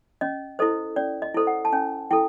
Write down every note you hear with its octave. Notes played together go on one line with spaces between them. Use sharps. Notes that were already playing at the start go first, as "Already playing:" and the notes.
C#4 D#5
E4 A4 C5 D#5
C#4 D5
D#5
E4 A4 C5
F#5
A5
C#4 G#5
E4 A4 G5